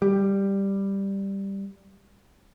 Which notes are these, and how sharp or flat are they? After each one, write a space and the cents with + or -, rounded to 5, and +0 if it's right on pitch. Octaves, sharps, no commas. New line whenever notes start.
G3 +5